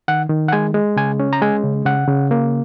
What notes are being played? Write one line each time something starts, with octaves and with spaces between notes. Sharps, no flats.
D#3 F#5
D#3
F#5
G#3 G#5
G#3
C#3 G#5
C#4
A#5
G#3 G#5
C#3
C#3 F#5
C#3
A#3